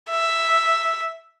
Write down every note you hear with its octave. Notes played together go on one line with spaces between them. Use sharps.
E5